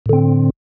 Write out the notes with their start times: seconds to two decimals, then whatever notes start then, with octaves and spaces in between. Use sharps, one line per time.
0.06 A2
0.09 D3
0.13 C4